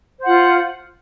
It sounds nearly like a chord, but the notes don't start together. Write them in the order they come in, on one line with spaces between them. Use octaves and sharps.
C5 F#5 F4